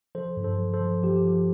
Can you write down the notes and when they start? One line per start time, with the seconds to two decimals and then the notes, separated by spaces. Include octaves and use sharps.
0.15 F3 A4 C5
0.37 G2
0.44 A4 C5
0.59 F3
0.74 A4 C5
0.81 F3
1.03 F3 G4
1.26 F3